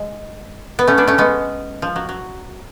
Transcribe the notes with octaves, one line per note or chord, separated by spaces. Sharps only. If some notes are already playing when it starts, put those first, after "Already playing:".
Already playing: G#3
B3
A3 C#4
B3 D4
A3 C#4
G#3 B3
F3
F#3
F#3